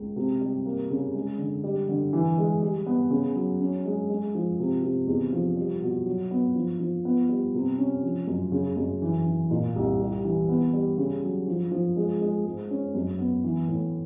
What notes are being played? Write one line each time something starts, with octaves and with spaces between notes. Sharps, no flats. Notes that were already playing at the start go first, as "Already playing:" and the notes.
Already playing: C#2
C3
G3
A#3
C#3
G#3
D3
G3
D3
E3
G#3
G3
B3
C#3
F#3
C#4
G#3
G#3
F3
C3
C3
E2
F3
G3
B2
F#3
B3
F3
F3
B3
G3
C3
C#4
F3
F#2
C#3
F#2
E3
E3
A#2
C2
G3
E3
B3
G3
C#3
F#3
F3
F3
G#3
G#3
G#2
C#4
F#2
B3
E3
A2